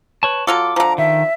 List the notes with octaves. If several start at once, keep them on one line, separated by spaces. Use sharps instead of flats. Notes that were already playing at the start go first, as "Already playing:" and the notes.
B4 C#5 A5
F#3 F4 A4 D6
D3 F3 A#5
D#3 E5